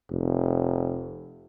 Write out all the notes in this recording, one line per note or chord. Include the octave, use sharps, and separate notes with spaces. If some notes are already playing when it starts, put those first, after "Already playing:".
F1